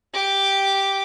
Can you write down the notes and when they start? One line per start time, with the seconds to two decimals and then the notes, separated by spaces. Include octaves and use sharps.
0.13 G4 D6